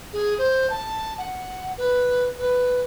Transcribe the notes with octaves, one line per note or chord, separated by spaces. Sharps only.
G#4
C5
A5
F#5
B4
B4